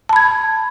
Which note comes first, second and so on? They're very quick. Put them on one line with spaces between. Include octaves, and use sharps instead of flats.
A5 B5 G#6